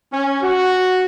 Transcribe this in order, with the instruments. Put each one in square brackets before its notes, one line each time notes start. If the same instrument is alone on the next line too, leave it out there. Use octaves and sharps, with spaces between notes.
[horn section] C#4
F#4